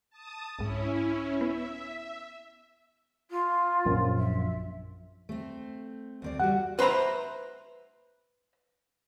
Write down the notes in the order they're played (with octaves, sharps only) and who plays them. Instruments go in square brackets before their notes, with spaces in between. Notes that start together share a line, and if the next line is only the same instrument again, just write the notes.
[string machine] A5 D#6
[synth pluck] C2 G#2 [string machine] C#4 E4
[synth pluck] B3 [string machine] E5
[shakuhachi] F4
[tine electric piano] A#1 F#2
[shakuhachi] E5
[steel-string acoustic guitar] A3 C4
D2 C4 D5
[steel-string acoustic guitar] G3 F#4 [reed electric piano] F#5
[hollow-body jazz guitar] B4 C5 E5 A#5 B5